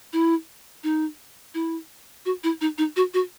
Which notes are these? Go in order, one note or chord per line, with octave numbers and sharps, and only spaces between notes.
E4
D#4
E4
F#4
E4
D#4
D#4
F#4
F#4